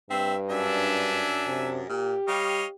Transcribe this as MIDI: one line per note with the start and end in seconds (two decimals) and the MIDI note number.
0.10 1.28 43
0.10 0.34 60
0.10 0.36 76
0.50 1.86 42
0.50 1.87 62
0.50 1.70 76
0.50 1.70 80
1.47 1.82 48
1.89 2.15 46
1.89 2.75 67
2.28 2.62 55
2.28 2.65 73
2.28 2.65 75
2.28 2.65 77